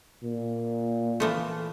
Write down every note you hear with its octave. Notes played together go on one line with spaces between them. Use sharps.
A#2
E3 F3 A3